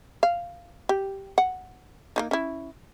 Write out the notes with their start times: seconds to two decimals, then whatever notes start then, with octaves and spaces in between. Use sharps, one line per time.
0.23 F5
0.89 G4
1.38 F#5
2.16 A#3 C#4 D#4
2.31 C#4 E4